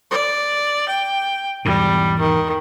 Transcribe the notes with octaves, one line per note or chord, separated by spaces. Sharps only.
D5
G5
E2 G#2 B2 G3
D#3